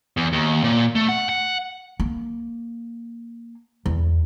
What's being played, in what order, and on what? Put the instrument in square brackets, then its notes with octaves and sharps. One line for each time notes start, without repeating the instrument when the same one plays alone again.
[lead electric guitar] E2
D#2
A#2
A3
F#5
F#5
[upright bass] A#3
E2